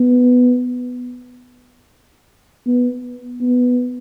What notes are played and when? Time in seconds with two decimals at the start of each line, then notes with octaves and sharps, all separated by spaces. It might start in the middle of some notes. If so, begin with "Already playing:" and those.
Already playing: B3
2.67 B3
3.41 B3